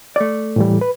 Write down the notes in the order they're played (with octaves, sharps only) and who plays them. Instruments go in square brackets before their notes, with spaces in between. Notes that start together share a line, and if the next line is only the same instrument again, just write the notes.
[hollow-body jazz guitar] A3 D5
[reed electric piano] A2 E3 G3
B4